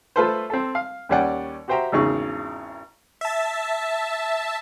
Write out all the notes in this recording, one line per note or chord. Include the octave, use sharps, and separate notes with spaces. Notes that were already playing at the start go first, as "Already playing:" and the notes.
A3 F4 A4 B4 C5
C4 A4
F5
D#2 G3 C#4 D5 F#5 G5
F#4 G4 C5 E5 G5 A#5
G#1 E2 C#3 D#4 G#4 C#6
E5 A5